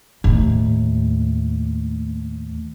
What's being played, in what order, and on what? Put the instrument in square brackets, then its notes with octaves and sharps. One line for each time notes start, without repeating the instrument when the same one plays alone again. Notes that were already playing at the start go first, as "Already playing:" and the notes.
[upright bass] D#2 A2